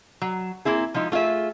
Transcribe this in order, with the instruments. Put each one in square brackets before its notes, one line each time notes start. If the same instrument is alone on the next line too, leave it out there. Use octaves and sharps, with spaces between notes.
[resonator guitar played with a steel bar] F#3
A#3 C4 E4 G#4
F3 G#3 D#4 E4
A3 F4 G#4 E5